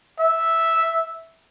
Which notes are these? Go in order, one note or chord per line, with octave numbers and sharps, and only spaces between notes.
E5